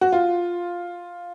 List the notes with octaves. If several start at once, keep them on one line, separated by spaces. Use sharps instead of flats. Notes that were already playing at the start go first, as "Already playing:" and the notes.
F#4
F4